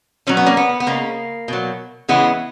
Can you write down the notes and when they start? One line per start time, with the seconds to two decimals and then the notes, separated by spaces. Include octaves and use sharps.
0.27 B2 F#3 C#4
0.37 B3
0.46 A#3 C#4
0.57 B3
0.80 B3
0.87 C#3 G#3 A#3
1.48 B2 F#3
2.09 C#3 E3 G#3 B3